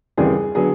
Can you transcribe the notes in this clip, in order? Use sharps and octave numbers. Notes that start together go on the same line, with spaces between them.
D#2 C#3 E3 G3 C4 G#4
D3 F#3 B3 G#4